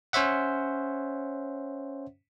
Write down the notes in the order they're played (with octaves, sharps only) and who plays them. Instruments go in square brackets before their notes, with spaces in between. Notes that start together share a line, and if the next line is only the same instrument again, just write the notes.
[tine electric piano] C#4 C5 C#5 E5 F#5